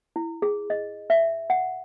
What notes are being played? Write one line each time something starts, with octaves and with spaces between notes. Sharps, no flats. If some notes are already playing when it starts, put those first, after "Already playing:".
E4
G#4
D#5
E5
F#5